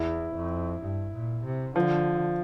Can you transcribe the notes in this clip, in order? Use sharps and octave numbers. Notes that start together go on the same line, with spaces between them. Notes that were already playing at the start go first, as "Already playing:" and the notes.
Already playing: E2 E4
F2
G2
A#2
C3
D3 F3